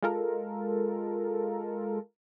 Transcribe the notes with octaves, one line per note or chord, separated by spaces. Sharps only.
G#3 F4 A4 A#4